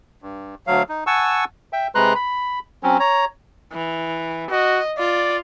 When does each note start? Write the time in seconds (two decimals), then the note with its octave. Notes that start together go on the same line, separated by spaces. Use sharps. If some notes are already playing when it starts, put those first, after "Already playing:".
0.22 G2
0.67 D2 F#3 F5
0.89 D#4
1.07 F#5 G#5 A5 C#6 E6
1.73 E5 G5
1.95 C3 G#3 B4 A#5 C6 F#6
2.15 B5
2.83 F#3 C4 C#4
3.00 C#5 A#5
3.73 E3
4.51 F#4 D#5
4.98 F4 D5